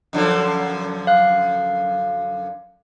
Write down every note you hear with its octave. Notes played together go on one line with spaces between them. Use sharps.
F#2 D3 F3
F5 F#6